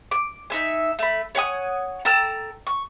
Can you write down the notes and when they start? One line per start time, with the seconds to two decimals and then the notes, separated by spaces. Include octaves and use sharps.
0.11 D6
0.50 D#4 E5 G#5
0.99 A3 B5
1.35 C#5 F#5 G#5 D#6
2.05 A4 G5 A#5 E6
2.67 C#6